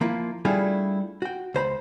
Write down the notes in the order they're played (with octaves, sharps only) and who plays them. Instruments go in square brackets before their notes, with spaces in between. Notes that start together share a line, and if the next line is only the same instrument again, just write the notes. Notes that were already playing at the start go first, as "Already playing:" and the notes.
[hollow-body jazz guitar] F3 A#3 E4 F4
G3 A3 D4 E4 F4 G#4
F#4 G5
C#2 C5 A#5 B5